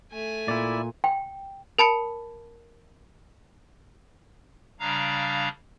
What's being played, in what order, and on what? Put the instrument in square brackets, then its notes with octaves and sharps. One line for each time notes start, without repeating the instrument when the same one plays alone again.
[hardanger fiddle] A3 G#5
[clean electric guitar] A#2 [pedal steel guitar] E4 D5
[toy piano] G5
[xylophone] A#4 A5 B5 C#7
[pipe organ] C#3 G3 D4 F5 A#5